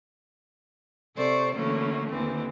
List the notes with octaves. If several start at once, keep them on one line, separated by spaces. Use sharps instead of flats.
C3 A4 C5 D5 C#6
D3 E3 F#3 A3 A#3 C#4
D#2 D3 E3 A#3 C4